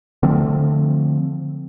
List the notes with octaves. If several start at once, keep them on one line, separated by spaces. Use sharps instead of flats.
D3 F3 A3 C4